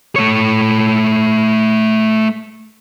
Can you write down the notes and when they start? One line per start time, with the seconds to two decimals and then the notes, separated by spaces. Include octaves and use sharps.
0.16 A3 C#5